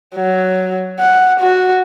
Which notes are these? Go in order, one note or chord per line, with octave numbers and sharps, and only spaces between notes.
F#3
F#5
F#4